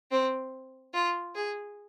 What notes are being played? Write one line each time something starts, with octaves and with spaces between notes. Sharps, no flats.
C4
F4
G#4